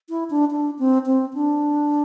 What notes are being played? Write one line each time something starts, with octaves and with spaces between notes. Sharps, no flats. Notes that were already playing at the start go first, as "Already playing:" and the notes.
E4
D4
D4
C4
C4
D4